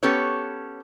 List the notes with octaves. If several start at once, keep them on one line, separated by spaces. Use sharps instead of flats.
B3 C#4 G4 A4 B4 C#5